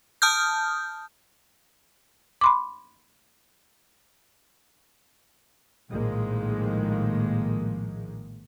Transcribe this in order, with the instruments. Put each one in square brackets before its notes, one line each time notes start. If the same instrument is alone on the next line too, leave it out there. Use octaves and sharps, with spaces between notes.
[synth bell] A5 D#6 F6 G6
[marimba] B5 C6 D6
[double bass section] A#1 A2 D#3 F3 G#3 A#3